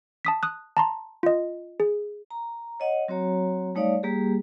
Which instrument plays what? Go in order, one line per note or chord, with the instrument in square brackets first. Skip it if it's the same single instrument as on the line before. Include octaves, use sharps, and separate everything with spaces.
[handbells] A5 D#6 B6
D#6 F#6
A5 A#5 C6
F4 D#5
G#4
[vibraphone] A#5
C#5 D#5 F#5
F#3 C4 F#4 C#5 A#5
G3 A3 D#4 C#5 D5 F5
G3 A#3 G4 G#4